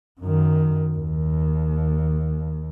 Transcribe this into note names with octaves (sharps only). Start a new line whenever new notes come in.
F#2 D#3
D#2